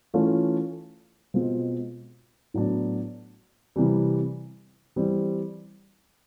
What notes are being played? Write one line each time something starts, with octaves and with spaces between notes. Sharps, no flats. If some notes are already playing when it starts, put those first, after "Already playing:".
E3 A3 C#4 F4
B2 G#3 C4 F4
A2 F#3 B3 D4
C3 E3 G3
E3 G3 C4